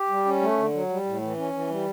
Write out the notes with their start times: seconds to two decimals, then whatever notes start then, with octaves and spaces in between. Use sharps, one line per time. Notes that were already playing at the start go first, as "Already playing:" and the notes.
Already playing: G4
0.09 G3
0.25 C#4
0.41 A3
0.57 D3
0.73 F#3
0.89 G3
1.05 A2
1.22 E3
1.37 C#4
1.53 E3
1.70 G3